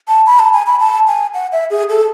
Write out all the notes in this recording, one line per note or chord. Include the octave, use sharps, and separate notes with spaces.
A5
B5
A5
G#5
B5
A5
G#5
F#5
E5
G#4
A4